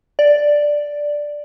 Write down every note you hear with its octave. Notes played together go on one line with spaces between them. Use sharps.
D5